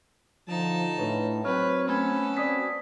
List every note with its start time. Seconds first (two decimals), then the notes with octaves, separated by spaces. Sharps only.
0.47 D3 F3 D#4 A5
0.98 A2 D4 B4 C#5
1.45 F#3 C4 B4 C#5 F6
1.88 A3 B3 C#4 A4 B5 G#6
2.37 C4 F#4 C5 D5 D#6 B6